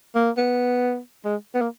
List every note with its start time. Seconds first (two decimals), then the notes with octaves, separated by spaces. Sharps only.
0.15 A#3
0.37 B3
1.25 G#3
1.55 B3
1.61 A#3